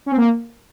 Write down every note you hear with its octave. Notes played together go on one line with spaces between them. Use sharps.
C#4
C4
A#3